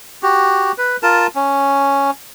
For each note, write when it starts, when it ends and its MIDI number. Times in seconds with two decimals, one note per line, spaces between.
0.23 0.72 66
0.23 0.72 67
0.78 0.96 71
1.03 1.27 65
1.03 1.27 70
1.03 1.27 81
1.35 2.11 61